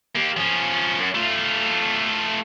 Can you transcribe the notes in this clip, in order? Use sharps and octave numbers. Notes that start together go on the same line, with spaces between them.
A#3 G4
F3 C#4
F#2
A3 F4